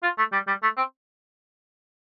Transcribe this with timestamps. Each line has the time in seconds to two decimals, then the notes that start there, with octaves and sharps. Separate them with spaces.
0.03 F4
0.18 A3
0.32 G3
0.47 G3
0.62 A3
0.77 C4